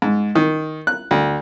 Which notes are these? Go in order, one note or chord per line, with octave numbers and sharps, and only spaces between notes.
G#2
D#3
F#6
D2